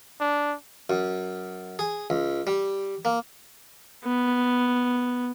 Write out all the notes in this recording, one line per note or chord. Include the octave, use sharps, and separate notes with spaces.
D4
F#2
G#4
C#2
G3
A#3
B3